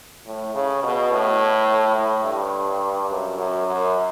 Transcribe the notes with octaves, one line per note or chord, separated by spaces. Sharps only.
A2
C#3
B2
A2
A2
G2
F#2
F#2
F#2